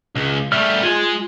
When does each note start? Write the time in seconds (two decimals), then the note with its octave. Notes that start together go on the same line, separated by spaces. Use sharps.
0.15 C#2
0.52 G3 A3 E5 F6
0.83 G#3 F4 G#5